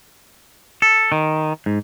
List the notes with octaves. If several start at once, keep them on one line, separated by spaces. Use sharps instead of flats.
A4
D#3
G#2